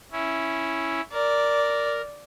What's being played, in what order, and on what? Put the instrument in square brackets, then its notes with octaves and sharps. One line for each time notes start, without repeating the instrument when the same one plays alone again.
[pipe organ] C#4 E4
[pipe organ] A#4 [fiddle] D5